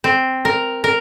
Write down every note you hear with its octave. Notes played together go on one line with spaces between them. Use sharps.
C4
A#4
A#4